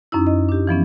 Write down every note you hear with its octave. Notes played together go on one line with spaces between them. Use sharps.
F#2 C#4 D#4 E4
D#5
D4 G4
E3 F3 B3 C#4